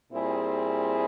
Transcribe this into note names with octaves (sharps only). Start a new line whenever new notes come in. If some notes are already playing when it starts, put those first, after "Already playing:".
A#2 G3 C4 E4 G#4